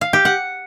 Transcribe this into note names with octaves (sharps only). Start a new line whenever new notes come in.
F5
G4
F#5